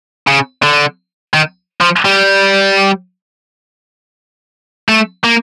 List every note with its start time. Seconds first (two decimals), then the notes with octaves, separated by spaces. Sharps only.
0.27 C#3
0.62 D3
1.34 D#3
1.81 F3
2.05 G3
4.89 A3
5.24 A#3